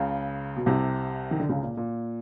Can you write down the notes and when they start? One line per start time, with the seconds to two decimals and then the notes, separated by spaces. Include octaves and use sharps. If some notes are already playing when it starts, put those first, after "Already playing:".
Already playing: C#2 C#3
0.56 B2
0.66 C2 C3
1.31 D#3
1.40 D3
1.49 C#2 C#3
1.63 A#2
1.77 A#2